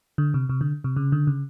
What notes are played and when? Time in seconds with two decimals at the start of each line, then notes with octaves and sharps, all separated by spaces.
0.18 D3
0.34 C3
0.49 C3
0.61 D3
0.84 C3
0.96 C#3
1.12 D3
1.27 C#3